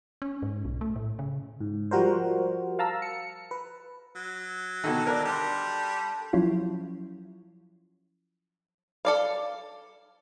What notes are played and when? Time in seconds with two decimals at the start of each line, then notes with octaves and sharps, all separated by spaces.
0.22 C#4
0.42 G#2
0.65 B1
0.81 A3
0.96 A2
1.19 C#3
1.61 G#2
1.91 F3 G3 F#4 A#4 C5
2.79 F5 A5 A#5 E6
3.02 C#7
3.51 B4
4.15 F#3
4.84 B2 D3 D#3 A4 A5
5.07 A#4 D5
5.25 G3 D4 C6
6.33 F3 F#3 C#4 E4 F4
9.05 A4 D5 F5